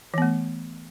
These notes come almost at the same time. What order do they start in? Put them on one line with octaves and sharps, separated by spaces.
E3 B3 A3